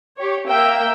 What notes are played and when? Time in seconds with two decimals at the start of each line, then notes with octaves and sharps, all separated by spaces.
0.17 G4 C#5
0.48 A#3 E5 G5 E6